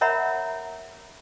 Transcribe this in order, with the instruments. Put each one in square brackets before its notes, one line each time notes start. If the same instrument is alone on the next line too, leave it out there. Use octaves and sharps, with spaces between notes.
[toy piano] A#4 C#5 E5 F#5 A#5 B5